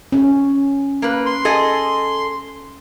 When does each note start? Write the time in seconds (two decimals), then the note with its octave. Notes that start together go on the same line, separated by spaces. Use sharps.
0.12 C#4
1.02 A#3 B4
1.26 C6
1.45 G#4 A4 D#5